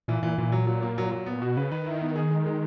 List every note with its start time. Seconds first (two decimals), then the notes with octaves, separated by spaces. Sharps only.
0.08 A#2 E3
0.22 A#2 E3
0.38 A#2 E3
0.52 F#3
0.67 F#3
0.82 A#3
0.98 F#3
1.12 F#3
1.26 B3
1.42 B2 F#4
1.57 C#3 B4
1.71 D#3 B4
1.86 E4
2.01 B3
2.16 G#4
2.31 G#3
2.46 G#3